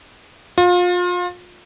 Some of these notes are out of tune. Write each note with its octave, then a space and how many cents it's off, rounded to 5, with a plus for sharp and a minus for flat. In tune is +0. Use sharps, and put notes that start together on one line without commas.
F4 +30